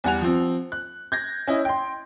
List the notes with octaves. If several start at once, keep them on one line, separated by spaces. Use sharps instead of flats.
E2 G3 F#5 G#5 F7
F3 C4
F#6
G6 G#6 A#6
C#4 E4 D#5
G5 C6